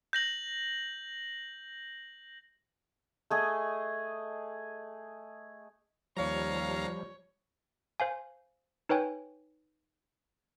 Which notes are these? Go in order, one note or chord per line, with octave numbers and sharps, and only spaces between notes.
G6 A#6 F#7
A3 G#4 D#5
D#2 F3 G3 C#5 F5 A#5
C5 F5 G#5
D#4 B4 C#5 G5 G#5